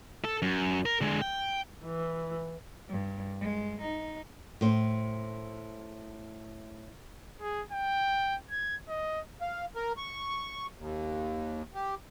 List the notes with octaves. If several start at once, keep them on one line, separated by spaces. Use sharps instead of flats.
A4
F#2
A#4
D3 G#3
G5
E3
G2
G#3
D#4
A2 C5
G#4
G5
G#6
D#5
F5
A#4
C#6
D#2
G4